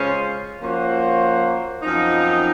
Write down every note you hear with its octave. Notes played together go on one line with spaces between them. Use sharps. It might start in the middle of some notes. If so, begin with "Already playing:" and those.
Already playing: C#3 G#3 C#4 F4 C5
F3 A#3 C#4 F#4 C5
F#2 F3 C4 D#4